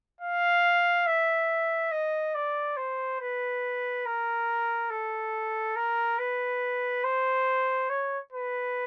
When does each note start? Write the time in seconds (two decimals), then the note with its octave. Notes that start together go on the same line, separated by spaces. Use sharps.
0.21 F5
1.07 E5
1.91 D#5
2.35 D5
2.77 C5
3.21 B4
4.06 A#4
4.90 A4
5.76 A#4
6.19 B4
7.04 C5
7.89 C#5
8.33 B4